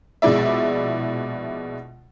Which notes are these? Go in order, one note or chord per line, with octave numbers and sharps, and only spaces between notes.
A#1 B2 G#3 E4 D5 E5